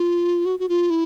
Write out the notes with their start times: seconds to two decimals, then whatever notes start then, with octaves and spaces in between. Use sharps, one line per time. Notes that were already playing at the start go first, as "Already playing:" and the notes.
Already playing: F4
0.46 F#4
0.59 F#4
0.69 F4
0.90 E4